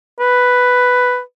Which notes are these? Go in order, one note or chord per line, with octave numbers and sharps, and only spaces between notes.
B4